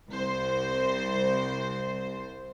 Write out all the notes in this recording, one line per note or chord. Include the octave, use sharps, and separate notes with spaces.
C2 C5